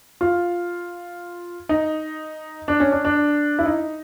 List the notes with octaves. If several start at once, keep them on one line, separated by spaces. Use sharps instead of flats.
F4
D#4
D4
C#4
D4
D4
E4
D#4